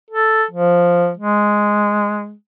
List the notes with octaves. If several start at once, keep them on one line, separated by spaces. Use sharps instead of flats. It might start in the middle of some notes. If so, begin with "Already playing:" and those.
A4
F3
G#3